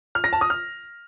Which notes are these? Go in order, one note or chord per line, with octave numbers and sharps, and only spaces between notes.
F6
A#6
A5
D#6
F6